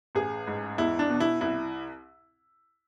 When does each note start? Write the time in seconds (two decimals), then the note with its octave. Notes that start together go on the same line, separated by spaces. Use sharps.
0.15 A1 G#4
0.47 G#2
0.78 E2 E4
0.99 D4
1.10 B2
1.20 E4
1.41 C2 E4